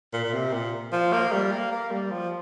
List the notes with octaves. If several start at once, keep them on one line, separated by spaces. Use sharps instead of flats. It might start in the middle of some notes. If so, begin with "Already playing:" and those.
A#2
A#2
C3
A#2
F3
A#3
G3
A#3
A#3
G3
F3